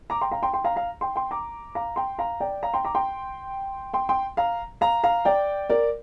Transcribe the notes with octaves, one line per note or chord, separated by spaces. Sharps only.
A#5 D6
G5 C6
F5 A#5
G5 C6
G5 C6
F5 A#5
F5 A#5
G5 C6
G5 C6
A#5 D6
F5 A#5
G5 C6
F5 A#5
D5 G5
F5 A#5
G5 C6
A#5 D6
G5 C6
G5 C6
G5 C6
F5 A#5
F5 A#5
F5 A#5
D5 G5
A#4 D5